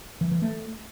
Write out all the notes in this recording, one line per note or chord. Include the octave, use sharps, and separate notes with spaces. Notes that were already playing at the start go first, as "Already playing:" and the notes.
E3
E3
A3